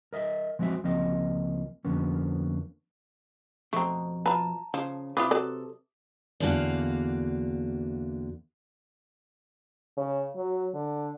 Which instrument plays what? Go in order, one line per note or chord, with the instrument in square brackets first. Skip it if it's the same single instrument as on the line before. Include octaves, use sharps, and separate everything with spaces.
[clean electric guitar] A#4 D#5 E5
F3 G#3 C4 F#4 E5
C#2 F3 A#3 C4 D#5
F2 D3 F3 A#3 B3 C#4
[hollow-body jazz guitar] F2 B2 [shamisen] A3 C4 [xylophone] A#5 C#6
[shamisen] F4 B4 [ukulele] A5 [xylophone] A#5
[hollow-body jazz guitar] C#3 [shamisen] F3
[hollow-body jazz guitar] C3 [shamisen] E4 F4 B4 [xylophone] D6 D#6
[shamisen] F#3 B4 D5 [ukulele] A4
[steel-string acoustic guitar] E2 D3 A#3 F#4 F5
[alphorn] C#3
F#3
D3